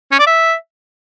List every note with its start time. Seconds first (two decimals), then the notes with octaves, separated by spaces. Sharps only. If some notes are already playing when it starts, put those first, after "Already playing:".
0.12 C#4
0.19 D5
0.27 E5